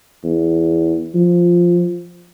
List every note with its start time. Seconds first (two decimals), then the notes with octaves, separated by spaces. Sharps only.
0.24 E2
1.15 F3